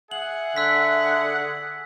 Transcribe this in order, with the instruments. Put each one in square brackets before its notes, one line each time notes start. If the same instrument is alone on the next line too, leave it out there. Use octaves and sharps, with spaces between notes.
[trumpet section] G#4 F#5 [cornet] E5 [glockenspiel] F#7
[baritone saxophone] D3 [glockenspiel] E6 B6